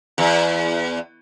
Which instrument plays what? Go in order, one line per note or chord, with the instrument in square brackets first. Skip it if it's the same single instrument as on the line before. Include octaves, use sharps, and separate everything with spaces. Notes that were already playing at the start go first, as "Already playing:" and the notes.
[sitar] E2